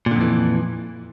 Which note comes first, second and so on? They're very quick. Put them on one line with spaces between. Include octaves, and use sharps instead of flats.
A#2 D3 F2 E3